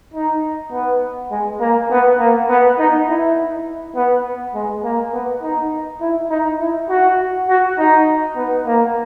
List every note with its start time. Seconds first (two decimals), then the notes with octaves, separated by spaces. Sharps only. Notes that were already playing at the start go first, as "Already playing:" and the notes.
0.14 D#4
0.72 B3
1.31 G#3
1.60 A#3
1.91 B3
2.19 A#3
2.49 B3
2.78 D#4
3.08 E4
3.96 B3
4.55 G#3
4.84 A#3
5.13 B3
5.42 D#4
6.01 E4
6.30 D#4
6.60 E4
6.89 F#4
7.49 F#4
7.78 D#4
8.36 B3
8.66 A#3